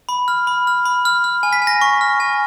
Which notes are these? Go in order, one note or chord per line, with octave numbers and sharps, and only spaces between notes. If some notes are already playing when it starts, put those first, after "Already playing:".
B5
F6
B5
F6
B5
F6
F6
G#5
B6
G#5
A#6
C#6
F6
G#5